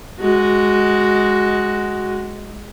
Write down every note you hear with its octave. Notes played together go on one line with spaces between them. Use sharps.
G#3 F#4